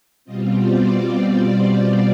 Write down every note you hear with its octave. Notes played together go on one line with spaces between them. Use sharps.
B2 G3 C4 F4 D#5
D5